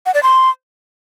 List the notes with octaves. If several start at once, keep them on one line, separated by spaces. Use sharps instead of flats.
F#5
D5
C6